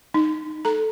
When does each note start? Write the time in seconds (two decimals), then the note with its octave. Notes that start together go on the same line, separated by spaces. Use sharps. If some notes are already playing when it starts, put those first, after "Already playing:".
0.14 D#4
0.65 A4 A#5